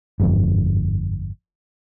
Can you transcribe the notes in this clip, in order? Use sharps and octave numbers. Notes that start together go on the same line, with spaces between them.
G1 F2 G#2